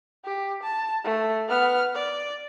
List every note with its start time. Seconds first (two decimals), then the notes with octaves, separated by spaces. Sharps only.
0.24 G4
0.63 A5
1.04 A3
1.48 B3 F6
1.94 D5